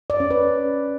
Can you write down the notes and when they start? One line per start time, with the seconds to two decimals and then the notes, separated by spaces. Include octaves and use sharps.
0.10 D5
0.20 C#4
0.31 B4